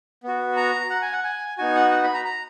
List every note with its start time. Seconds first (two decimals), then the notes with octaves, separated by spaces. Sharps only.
0.23 B3 F#4
0.57 A#5
0.90 F#5
1.02 G#5
1.13 F#5
1.24 G#5
1.58 B3 D#4 F#4 G#5
1.75 F#5
1.91 F#5
2.03 B5
2.14 A#5
2.25 A#5